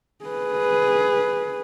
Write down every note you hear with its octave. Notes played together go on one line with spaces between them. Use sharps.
G#4 B4